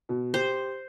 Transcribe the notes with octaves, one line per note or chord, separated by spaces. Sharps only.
B2
G4 C5